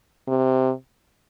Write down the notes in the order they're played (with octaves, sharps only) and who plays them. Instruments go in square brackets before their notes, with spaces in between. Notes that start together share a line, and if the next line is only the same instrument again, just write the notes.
[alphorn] C3